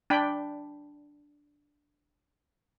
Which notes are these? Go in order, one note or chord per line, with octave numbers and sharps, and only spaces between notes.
D4 G5 B5